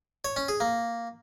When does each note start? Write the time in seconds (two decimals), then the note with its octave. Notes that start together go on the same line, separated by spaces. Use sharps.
0.25 C#5
0.36 C#4
0.48 G#4
0.60 A#3